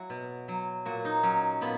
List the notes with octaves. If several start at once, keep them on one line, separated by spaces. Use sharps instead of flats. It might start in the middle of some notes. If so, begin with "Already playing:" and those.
Already playing: F#3 E4 F#4
B2
F#3
A#2 F#4
D#4
F#3 C#4
A#2 B3